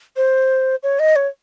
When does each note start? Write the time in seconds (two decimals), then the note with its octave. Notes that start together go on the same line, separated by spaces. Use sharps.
0.17 C5
0.83 C#5
0.99 D#5
1.16 C#5